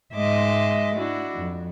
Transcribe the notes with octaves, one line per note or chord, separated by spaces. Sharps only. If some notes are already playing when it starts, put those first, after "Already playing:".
G#2 G#3 D#5 E5 C6 D6
D4 E4 F#4
F2